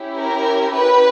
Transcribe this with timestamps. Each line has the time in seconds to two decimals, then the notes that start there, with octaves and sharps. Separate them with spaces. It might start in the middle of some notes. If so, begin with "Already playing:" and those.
Already playing: C#4 E4 G4
0.18 A#4
0.74 B4